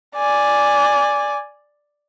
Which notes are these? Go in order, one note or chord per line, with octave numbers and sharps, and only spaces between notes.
D5 G#5